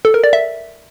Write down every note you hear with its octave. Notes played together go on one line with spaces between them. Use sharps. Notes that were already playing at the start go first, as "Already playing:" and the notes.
A4
A#4
D5
E5